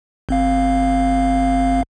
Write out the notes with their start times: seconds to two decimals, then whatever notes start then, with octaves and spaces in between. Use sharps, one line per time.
0.29 G1 C4 F5